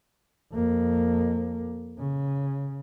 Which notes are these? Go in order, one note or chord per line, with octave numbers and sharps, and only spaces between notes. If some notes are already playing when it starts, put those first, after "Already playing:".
F2 A#3
C#3